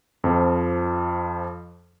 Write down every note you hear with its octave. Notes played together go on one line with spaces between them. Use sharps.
F2 F3